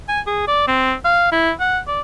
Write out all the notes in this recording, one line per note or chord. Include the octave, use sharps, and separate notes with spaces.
G#5
G#4
D5
C4
F5
E4
F#5
D5